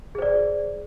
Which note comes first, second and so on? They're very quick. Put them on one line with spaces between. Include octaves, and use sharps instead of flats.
G#4 C5 D5